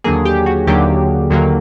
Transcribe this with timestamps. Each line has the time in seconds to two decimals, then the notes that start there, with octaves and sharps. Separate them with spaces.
0.04 D#2 D3 F#3 A#3 G#4
0.25 G4
0.46 F#4
0.67 D#2 D3 F#3 A#3 G4
1.30 D#2 D3 F#3 A#3